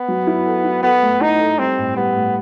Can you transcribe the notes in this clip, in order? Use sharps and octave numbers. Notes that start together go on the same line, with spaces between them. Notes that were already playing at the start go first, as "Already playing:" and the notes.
Already playing: B3
F#3
E4
A4
E4
B3 A4
A3
D#4 E4
A4
G3 C4
A2
G3 B3
A2